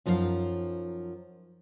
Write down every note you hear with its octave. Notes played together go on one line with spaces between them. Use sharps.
F#2 F3 D#4 F#4 F5